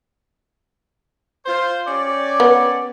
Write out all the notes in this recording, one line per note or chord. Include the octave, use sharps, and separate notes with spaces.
F4 C5
C#4 G4 D5
B3